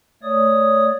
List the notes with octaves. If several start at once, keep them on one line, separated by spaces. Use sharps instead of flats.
A3 C#5 D5 D#6